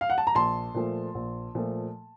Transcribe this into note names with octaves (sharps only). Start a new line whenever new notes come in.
F5
F#5
A5
A#5
A#1 A5 C6
A#2 F3 A3
A#1
A#2 F3 A3